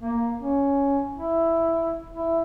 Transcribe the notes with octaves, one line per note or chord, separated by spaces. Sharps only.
A#3
C#4
E4
E4